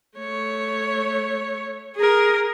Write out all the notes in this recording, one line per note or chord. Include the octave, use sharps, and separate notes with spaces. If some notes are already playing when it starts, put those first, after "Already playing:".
A3 C#5
G#4 A#4